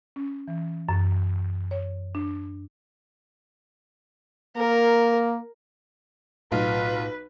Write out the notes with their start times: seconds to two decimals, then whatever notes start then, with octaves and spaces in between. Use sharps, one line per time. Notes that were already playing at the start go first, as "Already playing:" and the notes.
0.16 C#4
0.48 E3
0.89 F#2
1.71 C#5
2.15 D4
4.57 A#3 A#4
6.52 B1 A2 F4 B4